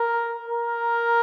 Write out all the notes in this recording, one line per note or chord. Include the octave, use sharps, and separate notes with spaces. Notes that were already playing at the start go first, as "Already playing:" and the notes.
Already playing: A#4
A#4